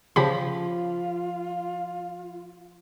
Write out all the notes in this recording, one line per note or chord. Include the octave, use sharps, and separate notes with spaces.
C#3 F3 F4 G4 B5